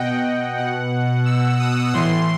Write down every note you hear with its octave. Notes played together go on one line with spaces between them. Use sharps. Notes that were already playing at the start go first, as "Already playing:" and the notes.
Already playing: B2 D#5 F#5 G5
B2 F#5
E6
D#6
A2 E3 C6